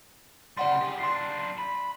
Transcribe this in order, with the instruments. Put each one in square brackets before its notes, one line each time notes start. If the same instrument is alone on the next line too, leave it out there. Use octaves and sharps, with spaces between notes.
[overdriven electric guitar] C#3 G3 [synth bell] D5 F#5 C6
[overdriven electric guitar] G4 G#4
[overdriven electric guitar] D4 F4 [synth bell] C6 C7
[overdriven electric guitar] B5